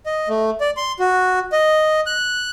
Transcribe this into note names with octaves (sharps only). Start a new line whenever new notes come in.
D#5
A3
D5
C6
F#4
D#5
F#6